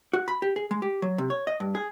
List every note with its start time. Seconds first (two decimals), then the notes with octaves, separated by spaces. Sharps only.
0.13 F#4
0.28 B5
0.42 G4
0.56 G#4
0.71 G#3
0.82 G4
1.02 F#3
1.18 C3
1.30 C#5
1.47 D#5
1.60 G2
1.75 G#4